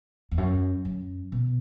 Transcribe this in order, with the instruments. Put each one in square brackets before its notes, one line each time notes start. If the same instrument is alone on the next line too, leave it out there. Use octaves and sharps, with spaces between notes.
[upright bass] E2
F#2
F#2
B2